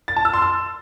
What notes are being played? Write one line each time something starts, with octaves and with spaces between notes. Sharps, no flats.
A6
A5
E6
C6
E6